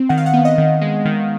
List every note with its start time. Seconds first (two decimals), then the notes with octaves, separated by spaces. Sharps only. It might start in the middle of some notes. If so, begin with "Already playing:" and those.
Already playing: C4
0.09 D#3 F#5
0.18 F5
0.26 F#5
0.34 B3
0.45 D#5
0.58 D#3
0.81 G#3
1.05 D#3